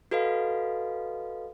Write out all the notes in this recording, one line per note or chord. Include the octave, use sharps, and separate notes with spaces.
F#4 A4 B4 D#5 F5